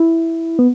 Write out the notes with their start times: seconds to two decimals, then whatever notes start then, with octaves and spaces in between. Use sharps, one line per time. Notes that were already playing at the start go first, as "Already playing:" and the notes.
Already playing: E4
0.59 B3